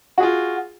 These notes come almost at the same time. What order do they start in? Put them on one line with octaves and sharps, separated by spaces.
F#4 G#4 F4